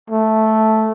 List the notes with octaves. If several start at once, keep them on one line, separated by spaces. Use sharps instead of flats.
A3